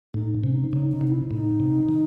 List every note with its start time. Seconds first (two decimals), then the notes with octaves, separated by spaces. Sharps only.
0.14 A2 D#4
0.42 C3 C#4
0.54 D#4
0.72 C#3 D#4
0.92 D#4
1.01 C3
1.07 D#4
1.11 E4
1.31 A2 D#4
1.60 C3
1.89 D#3